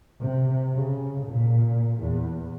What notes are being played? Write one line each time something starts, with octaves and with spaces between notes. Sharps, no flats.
C3
C#3
A#2
E2